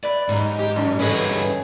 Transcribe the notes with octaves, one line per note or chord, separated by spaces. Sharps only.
E4 B4 D5
G#2 F#3 G3 D#4
G4 G#4 A#5
F#2
G2 D3 E3 C#4 G#4 B4 C#5 D#5